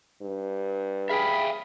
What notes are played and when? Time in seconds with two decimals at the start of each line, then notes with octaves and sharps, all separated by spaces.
0.22 G2
1.10 G#4 E5 F5 G5 B5